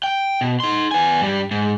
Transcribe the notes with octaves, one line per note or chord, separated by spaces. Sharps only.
G5
B2
D#4 C6
B3 G#5
G2 G3
G#2